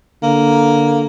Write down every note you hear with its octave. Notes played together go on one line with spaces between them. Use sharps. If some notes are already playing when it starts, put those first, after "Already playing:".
D3 A#3